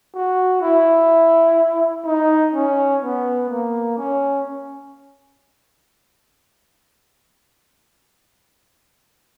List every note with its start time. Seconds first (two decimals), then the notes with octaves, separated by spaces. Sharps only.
0.15 F#4
0.61 E4
2.05 D#4
2.53 C#4
3.02 B3
3.50 A#3
3.98 C#4